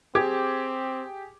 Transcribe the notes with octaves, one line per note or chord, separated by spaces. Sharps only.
C4 G4 G#4 D6 G#6